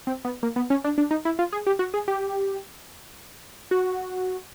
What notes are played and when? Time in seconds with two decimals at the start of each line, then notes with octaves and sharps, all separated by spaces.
0.07 C4
0.25 B3
0.43 A#3
0.56 B3
0.70 C#4
0.84 D4
0.98 D4
1.11 D#4
1.25 E4
1.39 F4
1.52 G#4
1.67 G4
1.79 F#4
1.94 G#4
2.08 G4
3.71 F#4